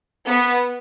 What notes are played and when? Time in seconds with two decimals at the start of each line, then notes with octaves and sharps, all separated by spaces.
0.27 B3